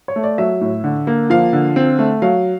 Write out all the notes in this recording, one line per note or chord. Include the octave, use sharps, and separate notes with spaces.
C#5
A3
D5
F#3 E5
A2
D3
A#3
F3 F5
D3
C4
A3
F#3 F5